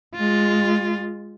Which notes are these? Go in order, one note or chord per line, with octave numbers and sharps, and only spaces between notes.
G#3 F4